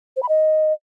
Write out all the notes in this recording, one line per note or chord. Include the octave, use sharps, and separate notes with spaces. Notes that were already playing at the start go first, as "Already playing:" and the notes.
C5
B5
D#5